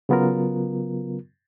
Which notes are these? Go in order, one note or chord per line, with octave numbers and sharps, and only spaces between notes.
C#3 F#3 B3 F4 A#4